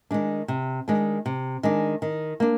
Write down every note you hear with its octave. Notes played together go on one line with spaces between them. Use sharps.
D#3 G#3 D4
C3
D#3 G#3 D4
C3
D#3 G#3 D4
D#3
A#3 D4